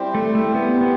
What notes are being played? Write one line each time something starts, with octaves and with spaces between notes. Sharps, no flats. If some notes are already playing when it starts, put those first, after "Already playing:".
Already playing: G3 C4 E4 G4 C5
A3
A3
B3
B3